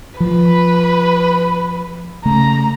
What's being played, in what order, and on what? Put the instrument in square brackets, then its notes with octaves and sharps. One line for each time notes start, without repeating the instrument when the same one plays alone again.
[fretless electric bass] F3 [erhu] B4
[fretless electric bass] C#3 A3 [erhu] A#5